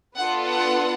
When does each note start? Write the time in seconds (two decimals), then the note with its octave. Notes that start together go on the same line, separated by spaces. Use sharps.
0.16 B3 D4 F4 A4 F#5
0.45 F#5